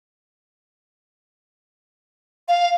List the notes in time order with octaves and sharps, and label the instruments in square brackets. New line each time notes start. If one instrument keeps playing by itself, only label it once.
[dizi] F5